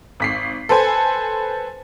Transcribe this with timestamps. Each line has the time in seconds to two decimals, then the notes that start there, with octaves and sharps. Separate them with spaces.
0.20 G#1 B6 C7
0.69 A4 B4 C5 G#5